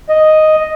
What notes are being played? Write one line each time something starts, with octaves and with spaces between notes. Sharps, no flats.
D#5